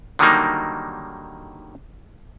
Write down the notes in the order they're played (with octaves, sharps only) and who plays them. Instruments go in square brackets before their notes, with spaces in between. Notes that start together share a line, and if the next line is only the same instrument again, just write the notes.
[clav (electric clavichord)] D3 D#3 F#3 G3 A#3 D#4